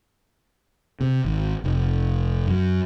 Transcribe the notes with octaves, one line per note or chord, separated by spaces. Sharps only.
C3
G#1
F1
F#2